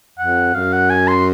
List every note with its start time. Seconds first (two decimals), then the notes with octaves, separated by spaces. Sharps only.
0.18 F2 F#5
0.55 F#2 F5
0.73 F#5
0.90 G#5
1.08 C6